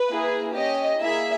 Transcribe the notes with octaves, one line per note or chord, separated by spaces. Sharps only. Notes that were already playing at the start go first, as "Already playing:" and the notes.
Already playing: B4
A#3 E4 G#4
C#4 G4 D#5
A#3 E4 G#4 E5